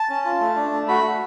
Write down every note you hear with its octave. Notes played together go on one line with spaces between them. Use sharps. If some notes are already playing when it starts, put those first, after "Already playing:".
Already playing: A5
C#4
F4
A3
D4
A3
F#4 B5
A3